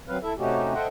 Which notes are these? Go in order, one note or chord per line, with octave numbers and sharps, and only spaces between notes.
F#3 C4 B4 F5
E4 A4 E5
C3 A3 C#4 D#4 F#4 G4
A4 C5 D#5 E5 F#5 G5